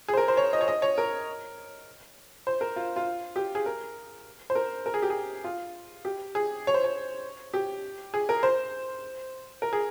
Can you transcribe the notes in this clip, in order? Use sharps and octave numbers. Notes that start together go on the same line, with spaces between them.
G#4
C5
A#4
C5
C#5
D#5
C#5
D#5
C#5
A#4
C5
A#4
F4
F4
G4
G#4
A#4
C5
A#4
A#4
G#4
G4
G#4
F4
G4
G#4
C#5
C5
C#5
G4
G#4
A#4
C5
A#4
G#4